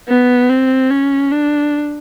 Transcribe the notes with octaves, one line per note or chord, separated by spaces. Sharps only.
B3
C4
C#4
D4